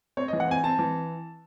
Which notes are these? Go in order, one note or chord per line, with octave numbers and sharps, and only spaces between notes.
C4 C#5
D#5
E3
F#5
C4 G#5
C4 A5
E3